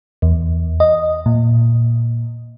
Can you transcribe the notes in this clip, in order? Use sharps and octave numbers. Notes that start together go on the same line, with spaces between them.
E2
D#5
A#2